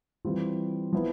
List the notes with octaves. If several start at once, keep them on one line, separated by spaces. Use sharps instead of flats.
E3 G3 C4 F4
F3 B3 E4